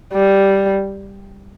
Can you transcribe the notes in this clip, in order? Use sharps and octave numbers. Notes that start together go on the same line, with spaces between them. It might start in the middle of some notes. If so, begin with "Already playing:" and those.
G3